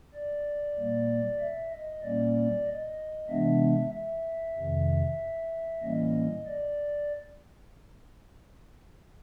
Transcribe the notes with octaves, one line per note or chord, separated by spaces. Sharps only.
D5
A#2 G3 A#3
E5
D#5
A#2 G3 A#3 C#4 D5
D#5
C3 E3 G#3 B3 D4 E5
E5
F2 C3 D#3
A2 E3 G3 A#3 C#4 D#5
D5